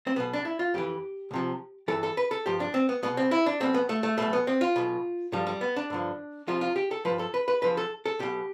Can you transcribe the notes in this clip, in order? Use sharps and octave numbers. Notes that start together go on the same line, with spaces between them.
C4
B1 B2 B3
D4
E4
F4
F2 E3 G4
C2 C3 F3
G2 E3 A4
A4
B4
A4
G2 F3 G4
D4
C4
B3
C2 B2 B3
C4
E4
D4
B1 B2 C4
B3
A3
A3
B1 B2 A3
B3
C4
F4
B1 B2
G2 D3 F3 G3
G3
B3
D4
G2 D3 F3
C2 C3 F3 F4
F4
G4
A4
G2 F3 B4
A4
B4
B4
E2 D3 F3 B4
A4
A4
B1 B2 G4